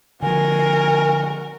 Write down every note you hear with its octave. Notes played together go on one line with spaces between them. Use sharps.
D3 F3 F#4 A#4 G#5